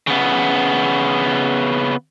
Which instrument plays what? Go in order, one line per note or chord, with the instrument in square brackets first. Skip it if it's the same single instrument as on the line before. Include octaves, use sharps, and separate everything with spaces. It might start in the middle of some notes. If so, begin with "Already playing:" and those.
[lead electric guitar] C#3 B3